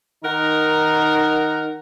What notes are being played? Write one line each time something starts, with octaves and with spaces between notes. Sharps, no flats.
D#3 D#4 A#4 F#5 A#5